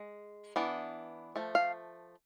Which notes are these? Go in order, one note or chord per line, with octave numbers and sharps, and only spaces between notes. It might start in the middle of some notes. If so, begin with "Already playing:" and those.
Already playing: G#3
E3 B3 D4
F3 A3
F5